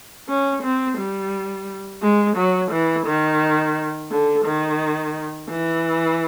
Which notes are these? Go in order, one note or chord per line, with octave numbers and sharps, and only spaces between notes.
C#4
C4
G3
G#3
F#3
E3
D#3
D3
D#3
E3